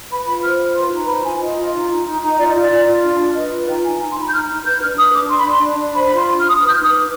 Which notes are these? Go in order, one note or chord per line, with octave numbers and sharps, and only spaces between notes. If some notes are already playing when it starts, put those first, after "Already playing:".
B4 B5
F4 B5
C5 F6
F4
B4 C6
D#4
C5 B5
F4 G#5
F4 D#5
F4
D#4
D#4
D#4
D#4
D#5
F4 D5
D#5
F4 D5
F4
F4
D4
D4
B4 D#5
F4
D#4 G5
D#4 G#5
D#4 G#5
C6
D#4
B5
G6
D#4 F6
D#4
B4 G6
D4 F6
B4 D#6
D4 D6
D4 C6
B5
D4 C6
D4
D4
C5 B5
B5
F4
C6
D4 C6
D4 F6
D#6
B4 D#6
G6
D#4 F6
D#6
B4 D6